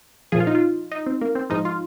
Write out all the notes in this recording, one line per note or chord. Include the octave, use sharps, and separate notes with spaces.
A#2 F3 G#4
F4
D#4
F4
D#4
C4
A#3
C4
G#2 F3 D#4
F4